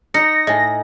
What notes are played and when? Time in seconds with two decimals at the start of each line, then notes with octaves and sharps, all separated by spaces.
0.14 D#4 A#6 C#7
0.47 A2 D#5 G#5